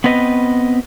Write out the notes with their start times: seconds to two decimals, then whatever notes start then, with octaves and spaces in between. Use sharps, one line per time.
0.04 B3 C4 B4 D#5